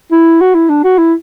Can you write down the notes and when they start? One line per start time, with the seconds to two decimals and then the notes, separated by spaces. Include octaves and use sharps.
0.12 E4
0.41 F#4
0.55 E4
0.69 D4
0.84 F#4
0.98 E4